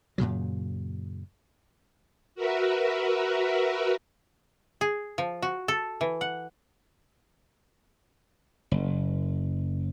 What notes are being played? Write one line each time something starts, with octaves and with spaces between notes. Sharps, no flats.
F#2 A#2 C#3 F#3
F#4 A#4 B4 E5
G#4
F3
F#4
A4
E3
F#5
F#1